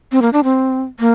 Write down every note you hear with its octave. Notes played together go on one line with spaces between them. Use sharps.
C4
A#3
D4
C4
A#3